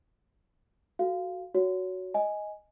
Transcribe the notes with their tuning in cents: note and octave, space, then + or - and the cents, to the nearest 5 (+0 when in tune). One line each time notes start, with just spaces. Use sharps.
F#4 +0 A4 -20 F5 -5
F#4 +0 C#5 +25
D#5 +10 G#5 +0